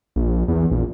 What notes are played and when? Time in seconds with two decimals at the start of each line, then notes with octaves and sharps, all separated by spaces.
0.16 A#1
0.48 E2
0.71 A#1